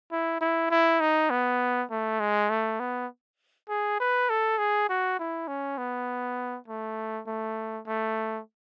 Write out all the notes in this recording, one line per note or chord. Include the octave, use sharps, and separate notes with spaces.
E4
E4
E4
D#4
B3
A3
G#3
A3
B3
G#4
B4
A4
G#4
F#4
E4
C#4
B3
A3
A3
A3